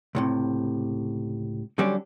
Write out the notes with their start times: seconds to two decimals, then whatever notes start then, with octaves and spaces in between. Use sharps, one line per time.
0.15 C#2 A2 C3
1.78 D3 F#3 G3 C#4 D4